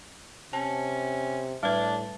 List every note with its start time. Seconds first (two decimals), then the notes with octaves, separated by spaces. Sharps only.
0.53 C3 C#4 A5
1.63 A2 G3 D4 B4